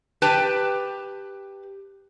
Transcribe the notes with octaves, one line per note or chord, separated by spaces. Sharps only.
G4 B4 G5 A5